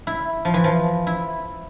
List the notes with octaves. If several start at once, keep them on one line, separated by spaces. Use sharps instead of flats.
E4
F3
E3
F3
E4